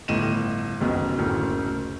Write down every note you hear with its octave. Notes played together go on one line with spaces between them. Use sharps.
G1 A2 D#5 D#7 E7
F#1 B1 B2
F#1 D2 A2 A#3